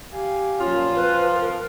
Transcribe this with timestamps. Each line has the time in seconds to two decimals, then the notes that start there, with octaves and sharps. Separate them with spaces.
0.13 G4 F5 G#5
0.59 A#2 F3 F#3 C#4 F4
0.94 C4 B4
1.33 A#4